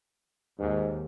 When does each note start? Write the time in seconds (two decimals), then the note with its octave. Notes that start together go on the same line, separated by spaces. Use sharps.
0.59 D#2 G#2